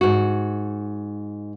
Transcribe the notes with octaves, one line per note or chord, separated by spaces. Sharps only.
G#2 F#4